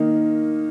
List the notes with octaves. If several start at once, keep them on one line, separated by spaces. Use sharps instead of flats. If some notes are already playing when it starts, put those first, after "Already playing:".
Already playing: D#3 A#3 D#4